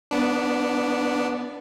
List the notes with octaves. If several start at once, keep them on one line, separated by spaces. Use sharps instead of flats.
B3 D4